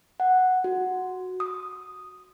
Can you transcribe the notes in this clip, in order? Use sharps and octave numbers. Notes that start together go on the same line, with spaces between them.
F#5
F#4
D#6